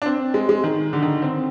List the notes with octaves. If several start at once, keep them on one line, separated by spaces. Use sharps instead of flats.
D4
C4
G#3
G#3
D#3
D3
D#3
C4